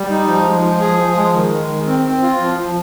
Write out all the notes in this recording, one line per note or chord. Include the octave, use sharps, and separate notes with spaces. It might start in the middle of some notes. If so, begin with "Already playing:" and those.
Already playing: G3
D#4
F3
G#3
F3
G#4
F3
G#3
D#3
G#3
D#3
C4
C4
F4
F3
F3